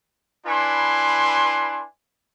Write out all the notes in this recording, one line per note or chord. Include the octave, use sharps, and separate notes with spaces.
D4 E4 B4 G#5 C6